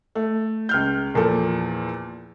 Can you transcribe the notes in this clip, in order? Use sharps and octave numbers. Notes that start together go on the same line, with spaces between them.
A3
C#2 F6 G6
E2 A#2 F3 A4